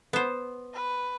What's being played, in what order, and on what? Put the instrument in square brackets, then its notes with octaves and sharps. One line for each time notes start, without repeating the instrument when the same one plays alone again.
[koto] B3 C5
[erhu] B4